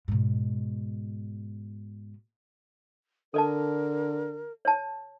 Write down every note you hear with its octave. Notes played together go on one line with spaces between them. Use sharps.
G#2 B2
D3 A4 A#4 D5 A5
C#5 A5